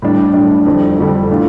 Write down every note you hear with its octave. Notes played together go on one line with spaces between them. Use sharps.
A2 G3 D4
A2 G3 D4
F2 D3 G3
F2 D3 G3
A2 E3 A3 D4 F4